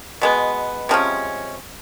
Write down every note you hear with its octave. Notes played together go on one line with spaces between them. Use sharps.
B2 G#3 B3
C3 F3 G#3 C#4